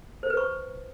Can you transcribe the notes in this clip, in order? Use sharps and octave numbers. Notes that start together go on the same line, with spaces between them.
C5
B4
C#6